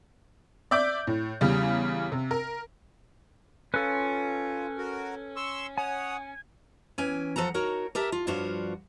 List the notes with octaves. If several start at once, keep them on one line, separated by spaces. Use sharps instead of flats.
D5 E5 D6 G6
A2
E2 C#3 G3
C3
A#4
C#4 F4 A4 B4
F#4 A#4
C6 C#6 E6
C#5 F#5 G#5 D#6
E3 C#4 G5 G#5
F3 A4 F#5 A#5
D#4 F#4 A#4 C#5
G4 A4 A#4 E5 A5
F4
G2 F3 D4 F4 F#4 C#5